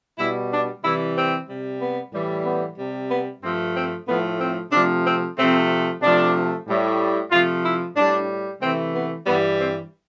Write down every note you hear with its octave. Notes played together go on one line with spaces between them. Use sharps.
B2 G3 E4
D4
C3 E3 G3 E4
C4
C3 G3
B3
A2 E3 G3
B3
C3 G3
B3
G2 F3 A3 C4
C4
A2 F3 A3 B3
C4
C3 F3 A3 D4
C4
C3 F3 A3 C4
C3 F3 A3 D4
A2 G3
C3 F3 A3 F4
E4
A2 G3 D4
C3 E3 A3 C4
B3
G2 E3 G3 B3
C4